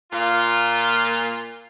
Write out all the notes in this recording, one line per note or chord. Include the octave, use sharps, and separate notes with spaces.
A#2 A#3 F4